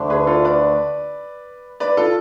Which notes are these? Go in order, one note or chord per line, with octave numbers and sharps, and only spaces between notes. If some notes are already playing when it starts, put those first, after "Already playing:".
Already playing: D2 D3 A3 D4
G#4 B4
F4 A4
B4 D5
B4 D5
F4 A4